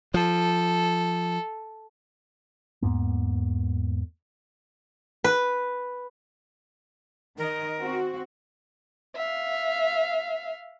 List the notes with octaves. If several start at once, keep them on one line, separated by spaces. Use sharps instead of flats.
F3 A4
E2 G#2 A#3 B3
B4
D#3 A#4 D#5
C4 F#4
E5 F5